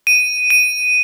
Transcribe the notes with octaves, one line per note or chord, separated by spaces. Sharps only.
D#7
D#7